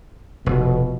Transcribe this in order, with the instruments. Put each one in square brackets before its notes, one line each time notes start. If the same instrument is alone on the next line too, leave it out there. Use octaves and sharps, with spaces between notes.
[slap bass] F1 [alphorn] B2